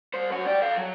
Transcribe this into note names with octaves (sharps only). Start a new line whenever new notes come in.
G3 C5
F#2 F#4
G4 D5
A4 F5
F#3